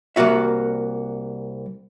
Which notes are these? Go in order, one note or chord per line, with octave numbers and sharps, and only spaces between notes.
C2 F#2 A#3 F#4 E5